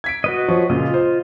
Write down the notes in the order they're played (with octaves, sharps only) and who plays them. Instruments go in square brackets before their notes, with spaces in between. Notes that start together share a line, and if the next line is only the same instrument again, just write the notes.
[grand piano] G#6 B6 D7
[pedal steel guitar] F#4 B4 D#5
[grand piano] F3 C#5 C#6
[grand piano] A#2 C#3 [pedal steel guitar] F4 D#5
[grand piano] C5